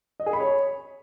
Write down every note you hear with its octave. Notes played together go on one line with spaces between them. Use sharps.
D#5
G#4
B5
C#5